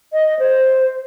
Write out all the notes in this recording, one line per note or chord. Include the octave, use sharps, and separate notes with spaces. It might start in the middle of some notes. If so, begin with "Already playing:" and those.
D#5
C5